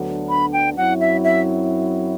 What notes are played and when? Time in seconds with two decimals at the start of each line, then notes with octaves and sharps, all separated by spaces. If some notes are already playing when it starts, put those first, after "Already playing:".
Already playing: D2 D3 F#3 B3 D4
0.29 B5
0.53 G5
0.76 F#2 F#3 C4 E4 F#5
1.00 E5
1.24 E5